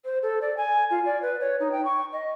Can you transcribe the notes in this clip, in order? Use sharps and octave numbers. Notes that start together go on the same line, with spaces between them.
C5
A4
D5
G#5
F4
D5
B4
C#5
D#4
G5
C#6
D#5